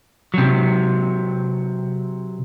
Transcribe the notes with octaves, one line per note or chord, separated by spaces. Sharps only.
C3 F#3